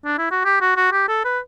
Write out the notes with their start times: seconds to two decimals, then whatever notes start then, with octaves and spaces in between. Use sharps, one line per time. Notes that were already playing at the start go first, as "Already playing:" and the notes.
0.05 D4
0.18 E4
0.31 F#4
0.45 G4
0.61 F#4
0.77 F#4
0.92 G4
1.08 A4
1.25 B4